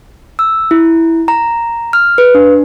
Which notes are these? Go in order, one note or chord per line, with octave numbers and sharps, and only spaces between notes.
E6
E4
A#5
F6
B4
D4